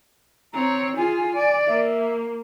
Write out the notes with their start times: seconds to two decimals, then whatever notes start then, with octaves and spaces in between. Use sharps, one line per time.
0.53 C4 C#5 A#5
0.97 F4 G#4 G#5
1.34 D5
1.67 A#3 E5